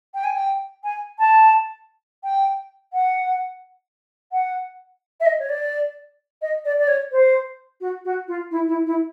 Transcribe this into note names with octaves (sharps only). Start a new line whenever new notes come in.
G5
G#5
G5
G#5
A5
G5
F#5
F#5
E5
D#5
C#5
D5
D#5
D5
D5
C#5
C5
F#4
F#4
F4
E4
E4
E4